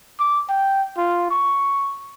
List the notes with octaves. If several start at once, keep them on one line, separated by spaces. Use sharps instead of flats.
D6
G5
F4
C#6